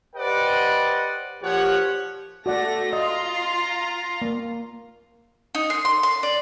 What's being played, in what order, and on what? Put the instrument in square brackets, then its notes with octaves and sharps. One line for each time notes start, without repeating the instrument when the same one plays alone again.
[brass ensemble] G4 B4 C5 D5 D#5 F#5
A#2 F3 G4 C#5 F#5
[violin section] A3 A#6 [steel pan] F#4 D5 F#5
[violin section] F4 A#5 C6 [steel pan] D#5
[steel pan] A#3
[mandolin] D#4
C6
C6
C6
D5